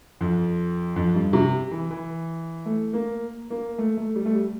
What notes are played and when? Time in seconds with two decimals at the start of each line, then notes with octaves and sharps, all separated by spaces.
0.21 F2
0.96 F2
1.15 G2
1.33 C3
1.71 E3
1.90 E3
2.66 A3
2.93 A#3
3.50 A#3
3.78 A3
3.97 A3
4.16 G3
4.26 A3
4.35 G3